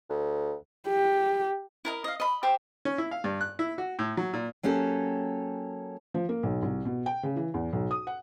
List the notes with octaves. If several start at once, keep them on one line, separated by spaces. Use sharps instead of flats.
D2
G4
E4 A#4 D#5
D#5 F5
D#5 B5
G4 C5 E5
C#4
E4
F5
G2
F#6
E4
F#4
A2
F#3
A#2
F#3 A#3 C#4 G4 A4
F3
A#3
B1
C2
B2
G5
C#3
E3
E2
B1
D#6
F#5